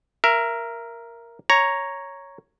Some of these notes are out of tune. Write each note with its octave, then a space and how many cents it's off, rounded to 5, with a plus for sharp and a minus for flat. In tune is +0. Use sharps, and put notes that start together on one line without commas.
A#4 +0 E5 +25
C#5 +0 A#5 +0